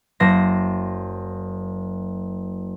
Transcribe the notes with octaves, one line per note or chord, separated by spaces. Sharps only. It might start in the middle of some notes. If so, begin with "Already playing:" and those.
F#1 C5 A#6